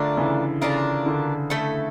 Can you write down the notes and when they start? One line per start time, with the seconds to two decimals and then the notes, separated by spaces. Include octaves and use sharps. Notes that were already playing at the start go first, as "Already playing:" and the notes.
Already playing: D3 A3 D4 F4 A#4
0.17 C#3 E3
0.61 C#3 A3 D4 F4 A#4
1.06 D3
1.50 A3 E4 A4